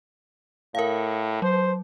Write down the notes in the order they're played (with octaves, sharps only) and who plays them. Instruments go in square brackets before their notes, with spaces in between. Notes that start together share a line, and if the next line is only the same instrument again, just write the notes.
[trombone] A2 [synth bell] A#4 F5
[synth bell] F#3 [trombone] C5